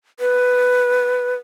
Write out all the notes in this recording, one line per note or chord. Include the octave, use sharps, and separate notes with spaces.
B4